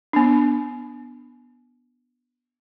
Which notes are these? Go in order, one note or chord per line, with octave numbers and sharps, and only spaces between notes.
B3 D4